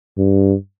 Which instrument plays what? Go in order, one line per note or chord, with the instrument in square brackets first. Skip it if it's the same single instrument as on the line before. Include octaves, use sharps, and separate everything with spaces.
[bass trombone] G2